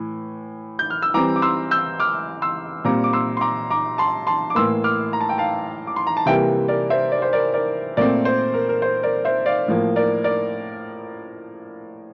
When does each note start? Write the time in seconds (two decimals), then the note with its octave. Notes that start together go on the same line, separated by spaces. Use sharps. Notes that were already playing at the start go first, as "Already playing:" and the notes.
Already playing: A2 E3
0.79 G6
0.90 F6
1.02 E6
1.14 E3 G3 C4 A#5 D6
1.36 D6
1.42 C6 E6
1.71 E6 G6
2.00 D6 F6
2.42 C6 E6
2.84 A#2 G3 C4 A#5 D6
3.04 D6
3.13 C6 E6
3.37 C6
3.41 A#5 D6
3.70 A#5 D6
3.98 A5 C6
4.27 A5 C6
4.50 D6
4.55 A2 E3 A#3 C6 E6
4.84 D6 F6
5.13 A#5
5.21 A5
5.29 G5
5.38 F5 A5
5.87 D6
5.96 C6
6.07 A#5
6.17 A5
6.26 C3 E3 G3 A#3 E5 G5
6.68 A#4 D5
6.90 C5 E5
7.12 D5
7.22 C5
7.33 A#4 D5
7.54 A#4 D5
7.97 A#2 A3 C4 A#4 D5
8.25 C5
8.54 A#4
8.69 A#4
8.82 C5
9.03 A#4 D5
9.25 C5 E5
9.46 D5 F5
9.68 A2 F3 A#3
9.96 A#4 D5
10.24 A#4 D5